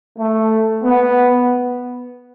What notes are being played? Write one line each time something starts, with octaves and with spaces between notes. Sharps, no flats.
A3
B3